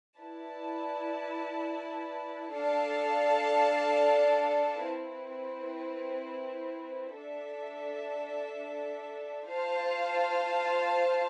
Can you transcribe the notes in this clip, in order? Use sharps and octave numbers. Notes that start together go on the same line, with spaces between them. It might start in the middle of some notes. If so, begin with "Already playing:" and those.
E4 B4 D5 A5
D4 A4 D5 F5 A5
C4 E4 B4
D4 A4 E5
F4 C5 F5 A5